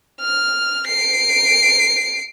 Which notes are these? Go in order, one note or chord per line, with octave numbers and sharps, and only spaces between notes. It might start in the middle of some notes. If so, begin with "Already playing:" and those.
F6
C7 D7